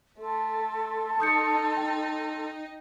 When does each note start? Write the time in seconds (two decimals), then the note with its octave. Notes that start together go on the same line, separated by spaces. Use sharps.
0.19 A3 A4 C6
1.20 D#4 D#6 G6 C#7
1.77 G5